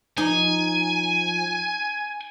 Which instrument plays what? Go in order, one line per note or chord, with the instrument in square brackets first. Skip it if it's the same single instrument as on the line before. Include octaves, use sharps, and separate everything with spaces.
[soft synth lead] F3 [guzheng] D#4 [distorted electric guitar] G#5